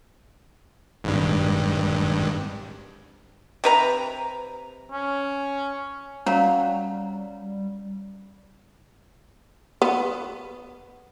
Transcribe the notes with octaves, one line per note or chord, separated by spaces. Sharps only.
G#1 G2
C3 B4 A#5
C#4
F#3 G3 C#4 F5 A#5
B3